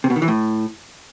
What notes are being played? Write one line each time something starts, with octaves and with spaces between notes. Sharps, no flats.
C3
B2
D#3
E3
A2